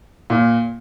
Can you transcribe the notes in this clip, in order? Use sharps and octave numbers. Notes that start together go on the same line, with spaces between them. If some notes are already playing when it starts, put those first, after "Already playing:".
A#2